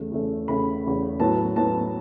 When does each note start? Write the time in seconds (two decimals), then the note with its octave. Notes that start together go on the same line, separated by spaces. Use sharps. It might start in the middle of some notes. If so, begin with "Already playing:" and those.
Already playing: E2 C#3 A3
0.12 E2 C#3 A3
0.48 E2 C#3 A3 B5
0.84 E2 C#3 A3
1.20 A2 F#3 B3 A5
1.56 A2 F#3 B3 A5